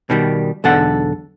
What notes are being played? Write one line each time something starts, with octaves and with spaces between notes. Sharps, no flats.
B2 D#3 G3
B1 E2 D3 A4 F#5